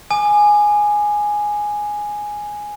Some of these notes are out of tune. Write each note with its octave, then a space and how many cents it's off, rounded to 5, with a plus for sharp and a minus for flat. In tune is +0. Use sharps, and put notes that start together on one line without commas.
G#5 +0 D6 +35